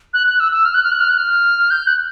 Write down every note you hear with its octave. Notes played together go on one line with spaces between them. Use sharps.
F#6
F#6
E6
E6
F6
F#6
F6
F#6
F6
F#6
F6
G6
F#6